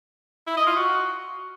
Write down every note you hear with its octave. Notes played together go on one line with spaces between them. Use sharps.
E4
D#5
F4
F#4